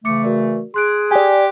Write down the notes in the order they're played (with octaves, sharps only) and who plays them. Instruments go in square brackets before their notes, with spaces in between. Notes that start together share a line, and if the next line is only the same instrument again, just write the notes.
[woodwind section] C#3 E3 A3 [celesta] D6 C#7
[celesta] F#4 A#4 D5
[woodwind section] G#4 [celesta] C6 F#6 D7
[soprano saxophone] G4 [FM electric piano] D5 G#5